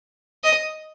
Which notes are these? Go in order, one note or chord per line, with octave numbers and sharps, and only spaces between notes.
D#5